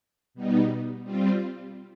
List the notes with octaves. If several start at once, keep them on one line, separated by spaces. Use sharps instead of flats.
B2 G3 B3 D#4
G3 C4 F4